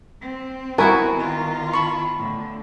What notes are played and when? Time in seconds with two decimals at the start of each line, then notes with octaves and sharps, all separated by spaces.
0.22 C4
0.78 B3 E4 F#4 A#4 G#5 C#6
1.15 D#3 F4
1.73 A5 B5 C#6
2.17 A2 D3